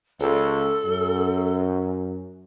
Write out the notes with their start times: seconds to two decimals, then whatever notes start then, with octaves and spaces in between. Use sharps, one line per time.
0.20 C#2 A4
0.85 F#2